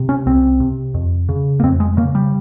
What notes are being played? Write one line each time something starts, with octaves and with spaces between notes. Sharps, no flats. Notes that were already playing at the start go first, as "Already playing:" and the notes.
Already playing: C3
C#4
C2 C4
C3
F2
C#3
A#3
F2 C4
G#3
C#3 A#3
G3